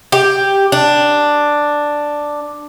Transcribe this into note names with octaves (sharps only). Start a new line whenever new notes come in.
G4
D4